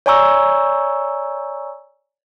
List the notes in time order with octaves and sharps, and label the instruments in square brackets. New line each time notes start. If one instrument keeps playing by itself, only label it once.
[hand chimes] C#5 D5 G#5 A#5 C#6 E6